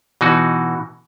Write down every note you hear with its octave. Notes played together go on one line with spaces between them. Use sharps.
B2 E3 D#4 F#4